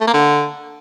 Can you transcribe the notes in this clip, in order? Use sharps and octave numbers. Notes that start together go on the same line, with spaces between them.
A3
A#3
D3